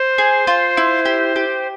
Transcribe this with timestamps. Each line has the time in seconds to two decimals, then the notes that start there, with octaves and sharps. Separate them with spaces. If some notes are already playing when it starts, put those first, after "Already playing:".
Already playing: C5
0.18 G#4
0.47 F4
0.77 E4
1.05 G4
1.36 G4